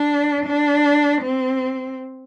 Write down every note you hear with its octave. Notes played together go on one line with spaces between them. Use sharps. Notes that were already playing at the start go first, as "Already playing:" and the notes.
Already playing: D4
D4
C4